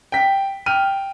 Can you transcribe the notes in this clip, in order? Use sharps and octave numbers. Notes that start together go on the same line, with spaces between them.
G5 B6
G5 F6 D#7